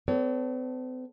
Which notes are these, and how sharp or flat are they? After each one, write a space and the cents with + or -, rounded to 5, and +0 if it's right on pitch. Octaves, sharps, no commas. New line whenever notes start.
C4 -45 A4 +0 C#5 +45